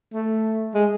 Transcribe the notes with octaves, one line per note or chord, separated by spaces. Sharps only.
A3
G#3